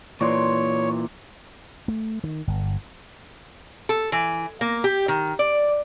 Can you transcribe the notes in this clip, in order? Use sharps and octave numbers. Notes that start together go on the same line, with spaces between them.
A#2 E3 C#5 D5 C6
A3
D#3
G1
A4
E3
A#3
G4
D#3
D5